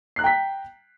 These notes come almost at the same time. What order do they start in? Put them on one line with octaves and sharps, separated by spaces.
C7 F#6 A#5 G5 B6